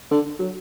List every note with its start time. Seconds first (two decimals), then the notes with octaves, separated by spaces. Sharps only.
0.11 D3
0.40 F#3